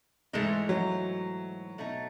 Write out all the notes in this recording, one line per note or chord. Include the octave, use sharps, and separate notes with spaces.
G#2 E3 G#3 A3 D#4
F#3
B2 A3 D#4